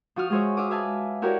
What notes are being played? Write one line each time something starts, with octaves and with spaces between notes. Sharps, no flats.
F3 F#4 D#6 F6
G#3 F#4 G#4 C5 C#5 E5
E5 F5 D6 D#6
B4 E5 F5 G#5 A5
E4 F#4 G4 A#4 C#5 D5